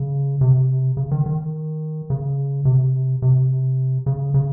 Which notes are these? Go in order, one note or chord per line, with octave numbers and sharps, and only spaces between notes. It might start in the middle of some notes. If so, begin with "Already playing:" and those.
Already playing: C#3
C3
C#3
D#3
D#3
C#3
C3
C3
C#3
C#3